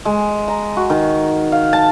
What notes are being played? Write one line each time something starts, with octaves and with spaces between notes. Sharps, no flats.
G#3
A#5
F#4
D#3
F5
A5